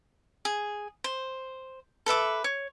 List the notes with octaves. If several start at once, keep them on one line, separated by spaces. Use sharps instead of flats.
G#4
C5
A4 B4 E5 D6
C#5